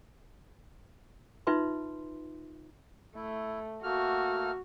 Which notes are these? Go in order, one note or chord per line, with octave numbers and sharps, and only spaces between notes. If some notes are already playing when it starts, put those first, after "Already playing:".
D#4 F4 B4 E5 C6
A3 E4
A3 A#3 F#4 F6